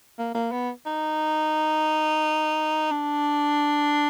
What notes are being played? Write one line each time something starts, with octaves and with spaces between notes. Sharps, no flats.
A#3
A#3
B3
D#4
D4